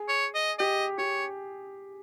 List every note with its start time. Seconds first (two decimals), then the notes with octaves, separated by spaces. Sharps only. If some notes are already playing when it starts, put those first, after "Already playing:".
Already playing: G#4
0.09 C#5
0.35 D#5
0.59 G4 D#5
0.98 G4 C#5